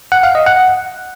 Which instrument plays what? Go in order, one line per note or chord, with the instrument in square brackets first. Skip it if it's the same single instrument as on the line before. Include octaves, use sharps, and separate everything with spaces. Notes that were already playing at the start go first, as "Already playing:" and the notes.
[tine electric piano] F#5
F5
D#5
F#5